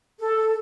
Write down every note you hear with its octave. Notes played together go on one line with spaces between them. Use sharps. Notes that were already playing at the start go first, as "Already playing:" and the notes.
A4